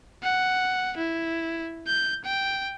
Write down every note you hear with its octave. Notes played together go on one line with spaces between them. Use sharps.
F#5
E4
G6
G5